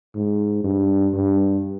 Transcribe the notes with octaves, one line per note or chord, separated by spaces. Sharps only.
G#2
G2
G2